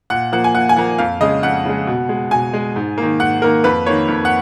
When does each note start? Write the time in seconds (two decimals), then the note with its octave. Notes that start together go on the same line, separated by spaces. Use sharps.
0.10 A#2 F#5
0.32 F3 A#3 F#5
0.44 G#5
0.55 A#2 F#5
0.69 G#5
0.76 F3 A#3 F#5
0.98 F2 F5
1.20 C#3 G#3 D#5
1.43 F2 F#5
1.65 C#3 G#3
1.87 B2
2.09 G#3
2.31 B2 G#5
2.53 G#3
2.76 G#2
2.98 D#3 A#3
3.20 G#2 F#5
3.42 D#3 A#3 A#4
3.64 F2 B4
3.86 D#3 A#3 C#5
4.08 F2
4.25 F#5